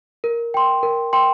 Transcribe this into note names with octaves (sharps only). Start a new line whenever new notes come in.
A#4
G5 C6
A#4
G5 C6